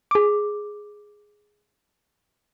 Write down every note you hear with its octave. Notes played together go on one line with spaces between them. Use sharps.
G#4 D6